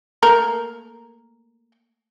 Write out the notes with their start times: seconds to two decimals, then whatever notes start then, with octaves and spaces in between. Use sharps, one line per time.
0.23 A3 A#3 A#4